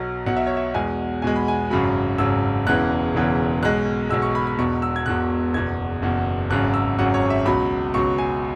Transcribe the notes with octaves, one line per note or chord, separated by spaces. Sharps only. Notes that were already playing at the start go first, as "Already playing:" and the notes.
Already playing: B1 B2 F#3
B1 B2 F#3 F#5
E5
C#5
E5
E2 B2 G#3 G#5
E2 B2 G#3 G#5
B5
G#5
G#1 F#2 C#3 F#3 B5
G#1 F#2 C#3 F#3 E6
E1 E2 C#3 E3 F#6
E1 E2 C#3 E3
B1 B2 G#3 F#6
B1 B2 G#3 E6
C#6
B5
B5
E1 E2 B2 C#6
E6
G#6
E1 E2 B2 F#6
F#1 E2 B2 G#6
F#1 E2 B2
G#1 F#2 C#3 F#3 F#6
E6
G#1 F#2 C#3 F#3 F#5
C#5
E5
C#2 B2 F#3 B5
C#2 B2 F#3 C#6
G#5